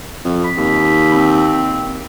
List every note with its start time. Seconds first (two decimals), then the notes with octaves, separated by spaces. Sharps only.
0.25 F2
0.44 B5
0.58 D#2
1.13 C4